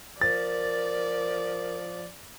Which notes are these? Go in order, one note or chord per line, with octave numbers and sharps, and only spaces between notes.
F3 A#4 D5 A6